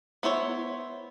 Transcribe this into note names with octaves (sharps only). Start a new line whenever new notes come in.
B3 E4 C5 C#5